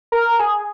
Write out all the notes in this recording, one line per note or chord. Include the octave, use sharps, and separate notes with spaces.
A#4
G#4